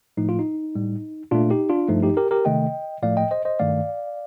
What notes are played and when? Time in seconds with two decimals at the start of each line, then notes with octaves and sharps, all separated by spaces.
0.17 A2 F3 A3 D#4
0.29 F4
0.39 D#4
0.75 A2 G3
1.31 A#2 A3 D4 F4
1.51 D#4 G4
1.70 D4 F4
1.88 G2 F3 A3 D#4
2.03 D#4 G4
2.17 G4 A#4
2.31 G4 A#4
2.45 C3 D#3 A3 D#5 G5
3.03 A2 F3 A3 D5 F5
3.17 D#5 G5
3.31 C5 D#5
3.45 C5 D#5
3.59 G2 D#3 A3 D5 F5